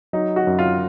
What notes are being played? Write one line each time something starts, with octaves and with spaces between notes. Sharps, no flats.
F#3 D#4
F#4
F#2
F4